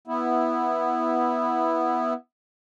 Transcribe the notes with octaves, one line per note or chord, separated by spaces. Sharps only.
B3 E4